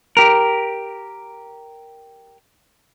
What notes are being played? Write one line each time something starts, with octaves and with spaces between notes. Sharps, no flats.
G4 A#4